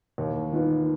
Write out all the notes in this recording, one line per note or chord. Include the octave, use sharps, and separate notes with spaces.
D#2
D#3 B3 F4